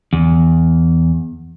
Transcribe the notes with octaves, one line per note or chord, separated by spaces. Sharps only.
E2